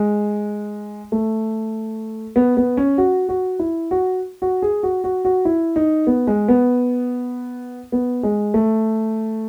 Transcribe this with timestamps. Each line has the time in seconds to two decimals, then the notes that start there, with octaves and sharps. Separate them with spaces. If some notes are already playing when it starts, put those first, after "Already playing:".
Already playing: G#3
1.12 A3
2.36 B3
2.57 B3
2.77 C#4
2.98 F#4
3.29 F#4
3.59 E4
3.91 F#4
4.42 F#4
4.62 G#4
4.83 F#4
5.04 F#4
5.25 F#4
5.45 E4
5.76 D#4
6.07 B3
6.27 G#3
6.48 B3
7.92 B3
8.23 G#3
8.54 A3